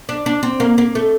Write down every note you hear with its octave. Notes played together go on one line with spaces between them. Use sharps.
D4
D4
C4
A#3
A#3
A3